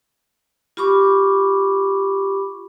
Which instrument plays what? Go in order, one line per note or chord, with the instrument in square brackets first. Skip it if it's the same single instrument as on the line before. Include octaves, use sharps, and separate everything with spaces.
[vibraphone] F4 G4 B5 C#6 D6